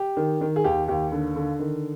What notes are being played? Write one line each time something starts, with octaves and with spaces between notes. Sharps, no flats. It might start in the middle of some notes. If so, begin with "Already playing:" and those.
Already playing: G4
D#3
D#3
G#4
D#2 G4
D#2 G4
D3
D3
D#3